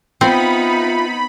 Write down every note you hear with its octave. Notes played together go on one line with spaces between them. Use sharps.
B3 C4 D#4 F4 E5 B5